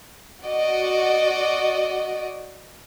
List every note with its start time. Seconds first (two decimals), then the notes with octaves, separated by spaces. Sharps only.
0.44 F#4 D5 D#5